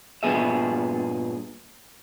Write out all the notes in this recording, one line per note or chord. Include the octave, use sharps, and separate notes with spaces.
G2 A#2 C#3 B3 G#4 E5